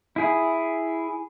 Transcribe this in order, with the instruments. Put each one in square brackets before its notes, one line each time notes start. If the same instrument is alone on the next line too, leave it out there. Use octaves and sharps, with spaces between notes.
[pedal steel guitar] E4 G#4